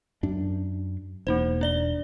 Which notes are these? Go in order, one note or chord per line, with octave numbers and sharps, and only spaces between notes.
F#2 D4
E1 A#3 D#4 C5
D4 D5 G7